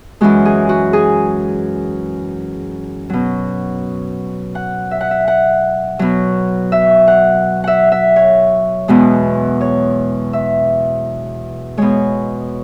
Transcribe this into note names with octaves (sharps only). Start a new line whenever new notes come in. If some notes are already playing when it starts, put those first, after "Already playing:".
F#2 E3 G#3 F#4
G#4
F#4
G#4
B2 F#3
F#5
E5
F#5
E5
F#5
B2 F#3
E5
F#5
E5 F#5
E5
C#5
E2 B2 G#3 F#4
C#5
E5
B2 G#3 C#5